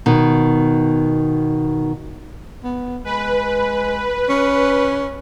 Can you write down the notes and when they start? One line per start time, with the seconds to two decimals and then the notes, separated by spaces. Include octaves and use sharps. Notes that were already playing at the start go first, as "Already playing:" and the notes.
0.06 B2 D#3
2.64 B3
3.05 G#3 B4
4.29 C#4